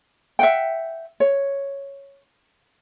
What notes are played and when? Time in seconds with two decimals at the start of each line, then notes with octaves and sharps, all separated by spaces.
0.39 E5 F#5 G5
1.20 C#5